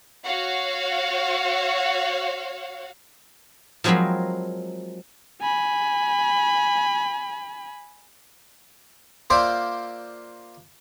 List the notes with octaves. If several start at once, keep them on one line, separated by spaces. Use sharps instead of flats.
F#4 C#5 F5 F#5
F3 F#3 G#3 C4 A#4 B5
G#5 B5
A#3 F4 C5 D5 E5 G5